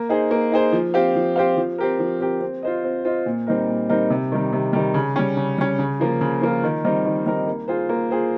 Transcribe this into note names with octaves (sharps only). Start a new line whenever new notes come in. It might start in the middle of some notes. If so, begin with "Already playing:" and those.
Already playing: A#3
D#4 G#4 C5
A#3
D#4 G#4 C5
F3
C4 G4 C5 F5
F3
C4 G4 C5 F5
F3
C4 G4 A#4
F3
C4 G4 A#4
C4
F4 C5 D#5
C4
F4 C5 D#5
A#2
G3 C4 D#4 A#4
A#2
G3 C4 D#4 A#4
C3
D#3 G3
C3
D#3 G3
C#3
G3 C#4
C#3
G3 C#4
C#3
F3 A#3 F4
C#3
F3 A#3 F4
D#3
G3 C4 D#4 A#4
D#3
G3 C4 D#4 A#4
A#3
F4 G#4 C5
A#3
F4 G#4 C5